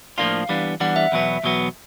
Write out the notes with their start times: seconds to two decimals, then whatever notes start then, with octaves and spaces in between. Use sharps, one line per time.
0.18 A2 F3 A#3 D4 F4 F5
0.49 E3 G3 B3 D4
0.80 E3 G3 B3 D4 F#5
0.96 E5
1.12 E2 B2 F#3 B3
1.43 E2 B2 F#3 B3